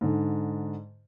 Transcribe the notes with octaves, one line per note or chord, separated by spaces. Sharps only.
G#2 D3